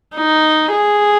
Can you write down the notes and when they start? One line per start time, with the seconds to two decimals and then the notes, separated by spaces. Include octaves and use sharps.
0.16 D#4
0.72 G#4